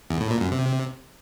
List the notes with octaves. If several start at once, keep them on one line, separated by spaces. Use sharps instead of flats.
E2
A2
A#2
F#2
C3